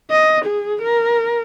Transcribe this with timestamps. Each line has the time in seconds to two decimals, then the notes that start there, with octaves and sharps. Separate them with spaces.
0.11 D#5
0.45 G#4
0.82 A#4